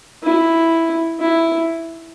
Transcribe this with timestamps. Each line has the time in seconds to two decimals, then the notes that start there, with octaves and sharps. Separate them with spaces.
0.23 E4
1.20 E4